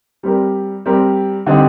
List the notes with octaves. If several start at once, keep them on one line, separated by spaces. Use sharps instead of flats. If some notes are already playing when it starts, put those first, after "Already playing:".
G3 C4 G4 A#4
G3 C4 G4 A#4
D3 G3 C4 D#4 G4